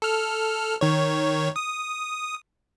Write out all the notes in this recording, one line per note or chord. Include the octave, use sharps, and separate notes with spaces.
A4 F6
D#3 C#5
D#6